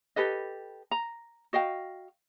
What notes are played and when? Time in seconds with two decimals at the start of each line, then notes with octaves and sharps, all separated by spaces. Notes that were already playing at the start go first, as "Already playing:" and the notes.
0.16 G4 A4 B4 D#5
0.91 A#5
1.53 F#4 D#5 F5 G5